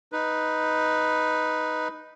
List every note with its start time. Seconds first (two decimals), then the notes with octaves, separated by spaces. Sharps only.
0.12 D#4 B4